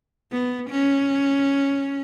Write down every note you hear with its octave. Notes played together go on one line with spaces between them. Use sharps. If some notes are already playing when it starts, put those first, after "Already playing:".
B3
C#4